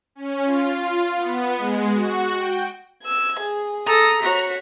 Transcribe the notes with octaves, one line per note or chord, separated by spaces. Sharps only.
C#4
F4
F4
B3
G#3
F#4
G5
E6 G#6
G#4
A4 A#5 D#6
F#4 C#5 B6